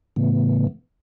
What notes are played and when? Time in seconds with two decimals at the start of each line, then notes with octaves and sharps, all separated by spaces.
0.16 A2 C#3 E3 A3 B3